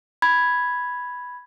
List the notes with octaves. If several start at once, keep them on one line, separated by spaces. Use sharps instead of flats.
B5 G#6